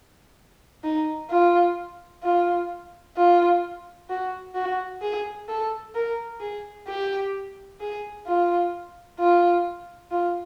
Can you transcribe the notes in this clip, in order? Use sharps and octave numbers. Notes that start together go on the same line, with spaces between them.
D#4
F4
F4
F4
F#4
F#4
G#4
A4
A#4
G#4
G4
G#4
F4
F4
F4